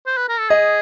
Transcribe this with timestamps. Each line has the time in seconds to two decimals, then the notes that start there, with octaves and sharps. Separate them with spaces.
0.07 C5
0.17 B4
0.29 A#4
0.39 A4
0.50 G#4 D#5